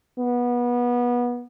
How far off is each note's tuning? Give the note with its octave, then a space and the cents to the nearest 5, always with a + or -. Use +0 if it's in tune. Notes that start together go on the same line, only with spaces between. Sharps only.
B3 -25